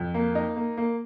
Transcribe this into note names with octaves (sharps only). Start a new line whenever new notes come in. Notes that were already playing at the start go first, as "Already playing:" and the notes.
Already playing: F2
A#3
D#4
A#3
A#3